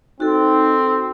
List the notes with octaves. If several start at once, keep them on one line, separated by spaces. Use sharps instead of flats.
C4 D#4 F#4 A4